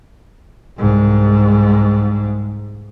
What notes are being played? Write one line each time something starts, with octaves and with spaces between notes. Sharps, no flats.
C2 G#2